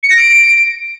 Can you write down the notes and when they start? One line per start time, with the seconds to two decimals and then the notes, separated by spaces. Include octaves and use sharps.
0.03 C#7
0.10 A#6
0.17 D7